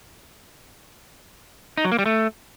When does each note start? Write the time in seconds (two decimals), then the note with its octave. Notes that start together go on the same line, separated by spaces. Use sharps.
1.77 D#4
1.85 F#3
1.92 A#3
1.99 G3
2.06 A3